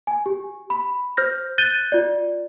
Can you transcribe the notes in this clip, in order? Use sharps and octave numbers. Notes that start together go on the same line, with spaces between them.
G#5
G4
B5
C5 F6 G6 A#6
F#6 G6 A6 D#7 G7
F4 D5